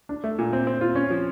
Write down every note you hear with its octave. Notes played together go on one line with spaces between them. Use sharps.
D4
A3
A#2
C4
C4
F4
C#4
F3